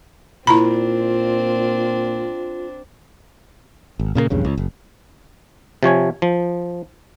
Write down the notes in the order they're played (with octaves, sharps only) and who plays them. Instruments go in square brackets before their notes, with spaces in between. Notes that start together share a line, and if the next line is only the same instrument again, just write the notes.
[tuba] A#2 [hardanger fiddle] C4 D4 [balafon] E4 A#5 B5 [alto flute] F4
[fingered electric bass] G#1
A#2 C#3 F#3 A#3
A#1 E2 G2 C#3
C#2
F#1
[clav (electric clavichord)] C3 F3 C#5 G#5
F3